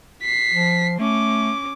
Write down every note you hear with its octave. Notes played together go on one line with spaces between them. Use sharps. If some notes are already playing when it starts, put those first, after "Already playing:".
B6 C7
F3
A3 C#4 D6